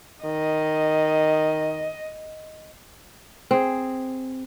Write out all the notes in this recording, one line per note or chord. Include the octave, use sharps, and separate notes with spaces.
D#3 D#5
C4 G#4